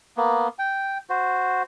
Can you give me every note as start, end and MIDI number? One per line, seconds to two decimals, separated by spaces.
0.17 0.48 58
0.17 0.48 59
0.59 0.98 79
1.09 1.63 66
1.09 1.63 72